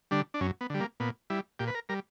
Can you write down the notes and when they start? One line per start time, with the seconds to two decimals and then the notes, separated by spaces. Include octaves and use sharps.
0.11 D3 G3 D4
0.34 D4
0.41 F#2 C#4
0.61 B3
0.70 D3 G3
0.80 A#3
1.00 A#2 B3
1.30 G3 E4
1.59 A#2 G4
1.67 B4
1.75 A#4
1.89 G3 A#4